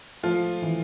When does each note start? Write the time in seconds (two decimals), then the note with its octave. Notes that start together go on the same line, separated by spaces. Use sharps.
0.23 F3 A3 F4
0.62 E3